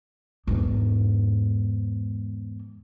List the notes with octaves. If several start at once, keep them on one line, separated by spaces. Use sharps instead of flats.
E2 G#2